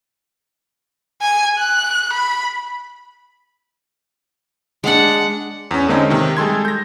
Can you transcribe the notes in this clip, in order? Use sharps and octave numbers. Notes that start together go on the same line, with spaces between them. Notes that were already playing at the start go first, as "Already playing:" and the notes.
G#5
F#6
B5
G#3 D4 F#5
E2 C#4
D3 G#3 A#3 C4 C#4 D#4
C3 D#3
G3 G#3 A4 C6 G#6
G6 A#6